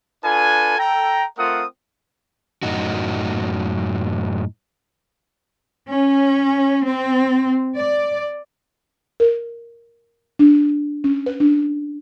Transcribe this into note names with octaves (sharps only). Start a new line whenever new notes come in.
D4 F4 A4 B4 G#5
A4 G5 A#5
A3 C4 F4 A#4 F#5 D#6
F#2 A2 D#4 F#4
C#4
C4
D5
A#4
D4
C#4
B4
D4